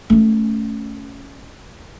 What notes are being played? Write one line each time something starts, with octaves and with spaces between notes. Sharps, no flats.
A3 C#4